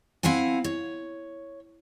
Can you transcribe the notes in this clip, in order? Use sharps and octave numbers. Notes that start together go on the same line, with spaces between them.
C4 E4 F5 F#5 G#5
C#5